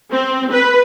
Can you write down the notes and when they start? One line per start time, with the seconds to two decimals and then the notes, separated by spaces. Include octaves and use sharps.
0.12 C4
0.51 B4